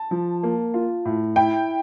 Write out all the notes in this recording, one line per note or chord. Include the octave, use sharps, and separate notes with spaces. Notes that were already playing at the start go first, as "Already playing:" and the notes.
Already playing: A5
F3
A#3
F4
A2
E4 G5